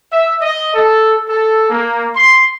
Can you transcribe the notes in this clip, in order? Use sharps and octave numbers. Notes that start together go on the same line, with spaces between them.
E5
D#5
A4
A4
A#3
C6